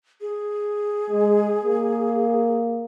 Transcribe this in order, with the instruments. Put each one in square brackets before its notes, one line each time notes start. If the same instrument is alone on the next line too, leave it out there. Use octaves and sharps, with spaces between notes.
[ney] G#4
[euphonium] G#3
A#3